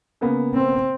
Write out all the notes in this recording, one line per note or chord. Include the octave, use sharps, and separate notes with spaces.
C#3 A#3 B3
C4